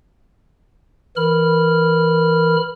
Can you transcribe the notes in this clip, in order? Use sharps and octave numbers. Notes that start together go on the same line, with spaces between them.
E3 A#4 B5 F6